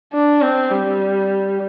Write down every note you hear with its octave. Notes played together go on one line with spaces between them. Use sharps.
D4
C4
G3